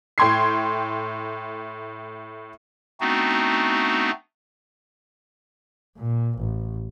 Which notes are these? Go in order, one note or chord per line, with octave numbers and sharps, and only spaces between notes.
A2 G5 C6 G#6 C7
A3 B3 C4 D4 D#4 F#4
A#2
A1